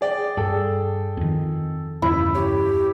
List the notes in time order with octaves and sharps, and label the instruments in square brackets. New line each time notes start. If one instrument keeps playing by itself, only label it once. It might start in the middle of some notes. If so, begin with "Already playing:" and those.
[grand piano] G#4 D5 G5
[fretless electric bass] G2 [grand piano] G#4 A4 G5
[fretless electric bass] F2 D#3
[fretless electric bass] E2 G2 C#3 [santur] E4
[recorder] G4 [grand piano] C#5